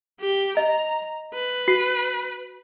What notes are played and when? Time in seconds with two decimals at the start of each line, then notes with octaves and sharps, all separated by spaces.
0.20 G4
0.57 D#5 A#5
1.34 B4
1.68 F#4 C7